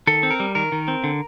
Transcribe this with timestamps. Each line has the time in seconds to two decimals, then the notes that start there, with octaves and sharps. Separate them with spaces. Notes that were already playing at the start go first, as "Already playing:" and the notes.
0.07 D#3 A4
0.23 C4
0.31 A#4
0.40 G3
0.55 D#3 A#4
0.72 D#3
0.88 C4
1.04 D3